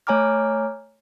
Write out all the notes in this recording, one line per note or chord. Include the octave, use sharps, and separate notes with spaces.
A3 C#5 G#5 A#5 D6 F6